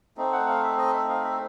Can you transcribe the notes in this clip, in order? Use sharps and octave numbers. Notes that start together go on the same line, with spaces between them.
A3 C4 D#4
F#5
F5
E5
D#5
E5
F5
E5